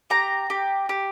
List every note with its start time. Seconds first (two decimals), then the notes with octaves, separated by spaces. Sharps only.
0.10 G4 A#5
0.50 G4
0.89 G4